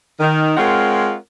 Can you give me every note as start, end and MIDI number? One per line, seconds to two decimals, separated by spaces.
0.20 0.54 51
0.57 1.15 56
0.57 1.15 60
0.57 1.15 65
0.57 1.15 70
0.57 1.15 73
0.57 1.15 78